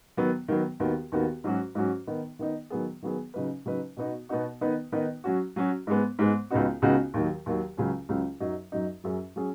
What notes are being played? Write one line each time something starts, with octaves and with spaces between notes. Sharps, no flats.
D#3 F#3 B3
D#3 F#3 B3
D#2 D#3 B3 F#4
D#2 D#3 B3 F#4
G#2 F#3 C#4 F#4
G#2 F#3 C#4 F#4
D#3 B3 D#4
D#3 B3 D#4
D#3 F#3 B3 G#4
D#3 F#3 B3 G#4
C#3 F#3 D#4 B4
C#3 F#3 D#4 B4
B2 B3 D#4 F#4
B2 B3 D#4 F#4
D#3 B3 D#4 B4
D#3 B3 D#4 B4
F#3 C#4 F#4
F#3 C#4 F#4
G#2 G#3 B3
G#2 G#3 B3
C#2 C#3 B3 D#4 F#4
C#2 C#3 B3 D#4 F#4
D#2 D#3 F#3
D#2 D#3 F#3
C#2 C#3 F#3 C#4
C#2 C#3 F#3 C#4
F#2 F#3 D#4
F#2 F#3 D#4
F#2 F#3 C#4 G#4
F#3 C#4 G#4